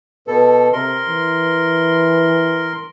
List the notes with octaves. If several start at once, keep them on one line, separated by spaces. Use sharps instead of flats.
B2 A4 B4
C3 A#4 C6
E3